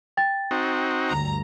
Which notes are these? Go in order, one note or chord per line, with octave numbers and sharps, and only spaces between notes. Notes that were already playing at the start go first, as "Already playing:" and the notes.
G5 A6
C4 D#4 F#4
D2 G2 A#5